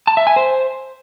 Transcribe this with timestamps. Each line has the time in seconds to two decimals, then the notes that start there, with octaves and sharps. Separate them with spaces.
0.07 A5
0.17 E5
0.27 G#5
0.36 C5